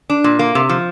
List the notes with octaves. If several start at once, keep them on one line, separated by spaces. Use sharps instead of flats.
D4
A#2
A#3
C3
F3